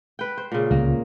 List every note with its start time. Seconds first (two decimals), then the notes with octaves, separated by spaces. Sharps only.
0.19 B4 G5
0.38 C5
0.52 A#2 C#3
0.71 C#2 A#3